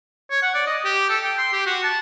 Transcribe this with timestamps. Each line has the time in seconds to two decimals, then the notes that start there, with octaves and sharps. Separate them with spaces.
0.31 C#5
0.42 F#5
0.54 D5
0.67 D#5
0.84 G4
1.09 A4
1.23 G5
1.38 C6
1.53 G4
1.66 F#4
1.84 A5